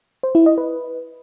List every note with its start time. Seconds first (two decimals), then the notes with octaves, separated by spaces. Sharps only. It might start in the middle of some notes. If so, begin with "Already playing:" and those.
0.23 C5
0.35 E4
0.46 D#5
0.58 B4